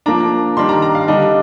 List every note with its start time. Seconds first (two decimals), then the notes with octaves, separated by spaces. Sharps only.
0.06 F3 A#3 D4 A#5
0.57 D#3 G3 D4 C6
0.69 A#5
0.82 A#5
0.95 F5
1.08 D3 G3 D4 D#5